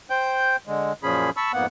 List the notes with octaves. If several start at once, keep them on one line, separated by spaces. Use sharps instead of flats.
C5 G5 G6
D3 G#3
F#2 A#2 F3 C#4 G#4 B5
A5 B5 C#6 E6
F2 G#2 A#3 B3 F#5